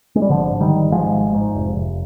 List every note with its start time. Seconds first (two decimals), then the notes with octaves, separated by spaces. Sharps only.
0.15 G#3
0.22 G3
0.29 G#1 D3 F3
0.50 G#2
0.61 D#3 G3
0.72 G#1
0.91 G#2 F3 G#3
1.13 G#1
1.35 G#2
1.55 F1
1.75 F1